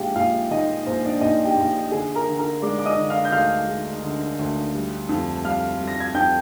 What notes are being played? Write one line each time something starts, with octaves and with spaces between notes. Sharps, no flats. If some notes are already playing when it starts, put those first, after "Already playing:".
Already playing: A#1 G#3 G4 F5 G5
A#1 F4 F5
A#2 D#4 D#5
A#1 C5
D4 D5
A#1 D#4 D#5
G4 G5
A#1
D3 G#4 G#5
A#4 A#5
D3
A#4 A#5
G#3 D5 D6
D6
D#5 D#6
D3
F5 F6
G6
D2 F5 F6
G#3
D3
D2
G3
F2
G3 F5 F6
G3
A#6
G#6
F2 G5 G6